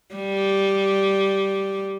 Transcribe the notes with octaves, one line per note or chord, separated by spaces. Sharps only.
G3